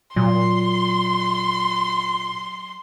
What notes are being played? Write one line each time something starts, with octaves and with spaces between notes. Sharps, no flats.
A#2 F#3 C6